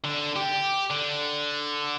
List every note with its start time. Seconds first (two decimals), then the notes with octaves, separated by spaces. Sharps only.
0.04 D3
0.36 G4
0.90 D3